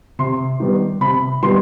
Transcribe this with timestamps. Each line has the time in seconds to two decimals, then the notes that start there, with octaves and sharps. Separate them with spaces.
0.19 C3 C6
0.60 D#3 G3 B3
1.01 C3 B5
1.43 D#3 G3 B3 C6